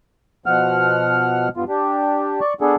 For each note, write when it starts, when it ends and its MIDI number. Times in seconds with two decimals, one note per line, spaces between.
0.46 1.49 47
0.46 1.49 53
0.46 1.49 78
0.46 1.49 89
1.57 1.64 43
1.57 1.64 59
1.57 1.64 65
1.69 2.40 62
1.69 2.40 67
2.41 2.54 74
2.41 2.54 85
2.61 2.76 59
2.61 2.76 62
2.61 2.76 68
2.61 2.76 69